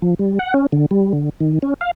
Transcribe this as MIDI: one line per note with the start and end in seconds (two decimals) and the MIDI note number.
0.02 0.14 53
0.19 0.39 55
0.39 0.54 78
0.54 0.66 61
0.72 0.86 50
0.91 1.13 55
1.13 1.29 50
1.40 1.59 51
1.62 1.74 61
1.81 1.91 77